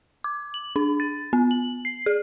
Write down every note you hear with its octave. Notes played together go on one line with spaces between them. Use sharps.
D6
F#7
D4
A6
B3
F#7
C7
G#4